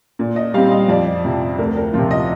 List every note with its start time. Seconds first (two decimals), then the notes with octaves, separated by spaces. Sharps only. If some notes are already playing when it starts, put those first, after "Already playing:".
0.19 A#2
0.36 D#5
0.54 G3 C4 F5
0.71 D#5
0.88 F2 D5
1.25 C3 F3
1.58 D2 A#4
1.77 A#4
1.93 C3 F3 F4
2.11 D#5